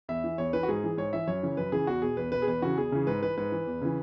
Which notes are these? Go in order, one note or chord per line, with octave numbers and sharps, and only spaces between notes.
E2 E5
E3
E2 C#5
E3 B4
F#4
G#2 G#4
E3
G#2 C#5
E3 E5
F#2 C#5
C#3 E3
F#2 B4
C#3 E3 G#4
E2 F#4
B2 G#4
E2 B4
B2 B4
G#4
E2 B4
C#3 E3 F#4
E2 G#4
C#3 E3
G#2 B4
E3 B4
G#2 B4
E3
E2
C#3 E3